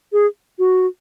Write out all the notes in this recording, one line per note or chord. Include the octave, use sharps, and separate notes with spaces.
G#4
F#4